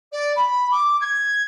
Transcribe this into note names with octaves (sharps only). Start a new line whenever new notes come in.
D5
B5
D6
G#6